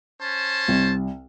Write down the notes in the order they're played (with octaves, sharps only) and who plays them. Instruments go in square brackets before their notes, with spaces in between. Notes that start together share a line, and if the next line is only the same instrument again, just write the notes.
[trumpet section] C#4 C5 A5
[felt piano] C2